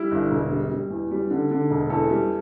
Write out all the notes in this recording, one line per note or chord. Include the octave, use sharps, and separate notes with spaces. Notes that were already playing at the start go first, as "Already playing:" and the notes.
Already playing: G3 E4
G1
E1
G3
G3
E2
G3
D3
D3
E1
E2 A4
G3